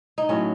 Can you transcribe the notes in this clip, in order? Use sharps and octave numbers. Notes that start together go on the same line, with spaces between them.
D#4
A2 F#3 C#4